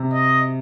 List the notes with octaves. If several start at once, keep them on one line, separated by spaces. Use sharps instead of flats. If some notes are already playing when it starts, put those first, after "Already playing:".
Already playing: C3
D#5